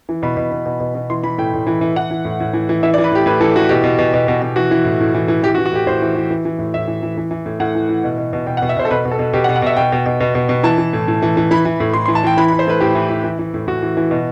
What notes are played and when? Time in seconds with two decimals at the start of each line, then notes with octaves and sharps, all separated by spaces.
0.09 E3
0.23 B2 B5
0.37 B2
0.52 B2
0.66 B2
0.80 B2
0.95 B2
1.10 E3 C6
1.23 E3 B5
1.38 A2 G5
1.53 A2
1.67 E3
1.81 E3
1.96 E3 F#5
2.10 E3
2.25 A2
2.40 A2
2.53 E3
2.69 E3
2.83 E3 E5
2.94 D5
2.98 E3
3.04 B4
3.11 A2 G4
3.26 A2 B4
3.40 E3 A4
3.55 E3 F#4
3.69 B2 G4
3.84 B2
3.98 B2
4.14 B2
4.28 B2
4.42 B2
4.56 E3 F#4
4.71 E3
4.85 A2
5.00 A2
5.14 E3
5.28 E3
5.43 E3 G4
5.55 F#4
5.58 E3
5.66 F#4
5.72 A2 G4
5.86 A2 C5
6.02 E3
6.15 E3
6.30 E3
6.45 E3
6.59 A2
6.74 A2 E5
6.88 E3
7.02 E3
7.17 E3
7.31 E3
7.46 A2
7.60 A2 F#5
7.75 E3
7.89 E3
8.04 B2
8.18 B2
8.33 B2
8.47 B2 G5
8.57 F#5
8.62 B2
8.69 E5
8.76 B2 C5
8.85 A4
8.91 B2 B4
9.05 B2
9.11 A4
9.19 B2
9.33 B2 G4
9.44 F#5
9.49 B2
9.56 F#5
9.62 B2 E5
9.77 B2 G5
9.92 B2
10.06 B2
10.20 B2
10.35 B2
10.49 B2
10.63 E3 A5
10.78 E3
10.93 A2
11.08 A2
11.22 E3
11.37 E3
11.51 E3 B5
11.65 E3
11.80 A2
11.94 A2 C6
12.06 E3 C6
12.15 A5
12.23 E3 G5
12.37 E3 B5
12.48 B5
12.52 E3
12.59 C5
12.67 A2 B4
12.80 A2 G4
12.95 E3
13.09 E3
13.24 E3
13.39 E3
13.54 A2
13.67 A2 F#4
13.82 E3
13.97 E3
14.11 B2